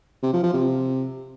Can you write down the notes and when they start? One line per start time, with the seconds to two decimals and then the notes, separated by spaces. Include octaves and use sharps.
0.23 C3
0.33 F3
0.43 F3
0.54 C3